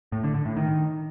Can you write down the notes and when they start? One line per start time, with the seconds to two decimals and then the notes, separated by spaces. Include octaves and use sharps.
0.12 A2
0.23 D3
0.34 D3
0.45 A2
0.56 D#3